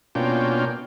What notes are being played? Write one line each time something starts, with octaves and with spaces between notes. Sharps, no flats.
B2 A#3 C#4 D4 F4 G5